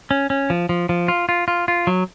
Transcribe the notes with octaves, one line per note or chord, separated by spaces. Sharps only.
C#4
C#4
F3
F3
F3
F4
F4
F4
F4
F#3